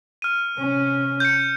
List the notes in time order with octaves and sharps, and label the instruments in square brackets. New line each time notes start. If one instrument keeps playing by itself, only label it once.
[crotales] F6 D#7
[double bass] C3 C#4
[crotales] G6 C#7